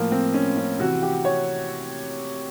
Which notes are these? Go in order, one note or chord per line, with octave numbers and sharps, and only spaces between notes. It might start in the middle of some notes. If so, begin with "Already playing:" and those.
Already playing: A2 F3 A#3
C4
C#4
C#4
C3 E3 F#4
G4
C#5